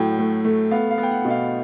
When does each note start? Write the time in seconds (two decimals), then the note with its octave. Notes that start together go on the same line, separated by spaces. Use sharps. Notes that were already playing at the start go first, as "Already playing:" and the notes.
Already playing: A2 F#3 G5
0.19 A3
0.45 A3
0.71 B3 F5
0.91 F5
0.98 B3
1.03 G5
1.11 F#5
1.22 B2 F#5
1.30 F5